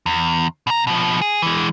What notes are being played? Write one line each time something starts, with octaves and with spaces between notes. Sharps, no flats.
E2
B2 A#5
B2 F3
G#4
E3 G#3